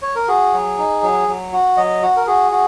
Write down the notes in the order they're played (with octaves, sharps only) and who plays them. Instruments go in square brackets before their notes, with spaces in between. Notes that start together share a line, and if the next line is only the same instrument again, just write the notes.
[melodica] C#5
A#4
F#4 G#4
F#3
D#4
F#3
F#3
F#4
F#3 D#5
F#4
A#4
F#4 G#4
F#4